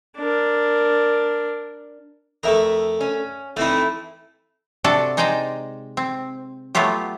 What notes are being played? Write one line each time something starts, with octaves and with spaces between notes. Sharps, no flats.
D4 A#4
F2 A3 A#4 E5
C#4
E3 A3 C4 D#4 E4
C3 D4 F#4 A4 D5 A5
G#3 D#4 C5 D5 G5 A#5
C4
F#3 A3 B3 F4 G4